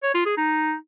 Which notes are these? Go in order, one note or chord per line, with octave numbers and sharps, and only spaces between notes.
C#5
F4
G#4
D#4